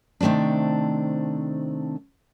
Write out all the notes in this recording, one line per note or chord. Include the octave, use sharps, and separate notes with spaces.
C3 D#3 A3 C4 D4